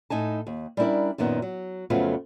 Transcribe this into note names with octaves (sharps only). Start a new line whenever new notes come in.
A2 D#4 G#5 A5
D#2
G3 C#4 D4 E4 A#4 D5
F#2 A#2 D#3 B3
F#3
F2 C#3 F#3 A3 B3 F4